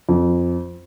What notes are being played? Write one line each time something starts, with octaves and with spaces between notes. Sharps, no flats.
F2